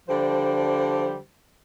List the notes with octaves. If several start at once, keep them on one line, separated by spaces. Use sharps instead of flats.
D3 F3 G3 C5